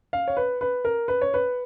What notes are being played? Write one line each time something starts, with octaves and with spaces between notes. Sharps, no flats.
F5
C#5
B4
B4
A#4
B4
C#5
B4